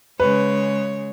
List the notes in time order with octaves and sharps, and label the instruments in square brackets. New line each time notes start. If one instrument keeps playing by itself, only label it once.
[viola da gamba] C#3 G#3 C#5 [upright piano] B4